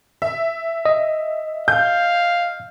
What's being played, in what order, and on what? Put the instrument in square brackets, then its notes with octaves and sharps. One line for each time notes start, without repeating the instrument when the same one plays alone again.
[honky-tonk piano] E5
[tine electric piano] D#5
[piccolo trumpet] F5 [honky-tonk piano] G6